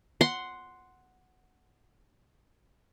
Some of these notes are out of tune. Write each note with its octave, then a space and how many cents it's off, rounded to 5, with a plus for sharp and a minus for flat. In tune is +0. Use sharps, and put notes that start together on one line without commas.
F#5 +0 C6 +0